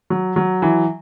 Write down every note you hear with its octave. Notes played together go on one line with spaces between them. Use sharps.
F#3
F#3
E3